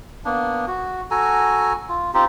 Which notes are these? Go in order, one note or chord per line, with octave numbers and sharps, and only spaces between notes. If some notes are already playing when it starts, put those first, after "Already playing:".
A#3 B3 D4
F#4
F#4 A4 G#5 A#5
F4
C4 D#4 F4 G4